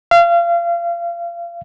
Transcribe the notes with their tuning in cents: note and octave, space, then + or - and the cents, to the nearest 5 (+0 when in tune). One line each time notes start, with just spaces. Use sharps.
F5 -30